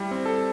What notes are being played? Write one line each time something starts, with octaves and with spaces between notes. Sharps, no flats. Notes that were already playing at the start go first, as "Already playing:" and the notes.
Already playing: G3 E4
C4
A4